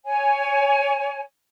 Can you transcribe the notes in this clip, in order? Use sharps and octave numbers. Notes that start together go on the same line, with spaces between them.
C#5 G#5